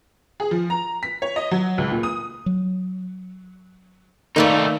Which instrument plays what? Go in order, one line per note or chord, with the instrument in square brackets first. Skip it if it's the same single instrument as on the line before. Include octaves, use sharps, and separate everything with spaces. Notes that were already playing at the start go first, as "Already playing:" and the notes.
[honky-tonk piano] G#4
F3
A#5
B6
C#5
D#5
F#3
C#2
A#2
D#6
[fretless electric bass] F#3
[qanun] D#3 [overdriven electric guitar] A3 D#4 [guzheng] A#3 B4 D5